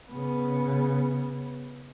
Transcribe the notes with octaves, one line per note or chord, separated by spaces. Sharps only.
C#3 B3